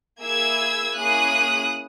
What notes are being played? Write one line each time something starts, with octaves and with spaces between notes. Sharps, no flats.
A#3 E4 G#4 E6 G#6
A#3 C#4 E4 G#4 D#6 F#6